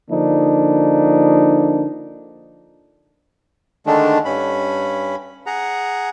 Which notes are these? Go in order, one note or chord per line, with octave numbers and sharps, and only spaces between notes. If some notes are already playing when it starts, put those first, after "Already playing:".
D3 F3 A#3 D4 D#4
D3 D#3 G#3 A3 D4
G2 C#4 B5
G#4 F#5 A#5